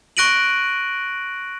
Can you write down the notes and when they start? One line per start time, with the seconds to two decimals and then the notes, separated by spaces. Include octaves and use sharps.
0.17 C#6 F#6 A#6 D7 D#7 F#7